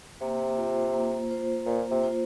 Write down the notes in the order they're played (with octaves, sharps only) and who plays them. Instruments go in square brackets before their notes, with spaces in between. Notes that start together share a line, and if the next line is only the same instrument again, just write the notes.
[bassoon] C3 [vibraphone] A#3
[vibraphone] F4 C5
A#3
F4 C5
[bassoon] A#2 [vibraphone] A#3
[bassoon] C3
[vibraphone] F4 C5